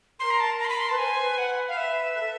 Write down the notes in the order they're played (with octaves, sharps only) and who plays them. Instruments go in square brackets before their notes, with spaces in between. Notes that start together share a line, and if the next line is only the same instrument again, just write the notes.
[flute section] A#4 [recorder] C6
[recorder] A#5
A5
A#5
C6
B5
C6
[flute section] B4 [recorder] A5
[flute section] C5 [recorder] G#5
[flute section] B4
[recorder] F#5
F5
E5
[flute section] A4